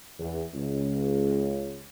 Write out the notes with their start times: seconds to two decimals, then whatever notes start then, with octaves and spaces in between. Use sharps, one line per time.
0.20 E2
0.53 C#2